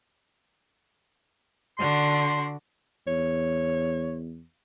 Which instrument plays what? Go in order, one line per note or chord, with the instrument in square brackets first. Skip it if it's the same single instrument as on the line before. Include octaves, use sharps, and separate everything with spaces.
[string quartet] D3 D4 F#4 [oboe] C6
[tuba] E2 [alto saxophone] C#5